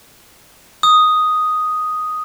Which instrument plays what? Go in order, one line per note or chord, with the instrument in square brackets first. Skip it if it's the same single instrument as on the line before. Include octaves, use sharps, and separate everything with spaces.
[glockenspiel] D#6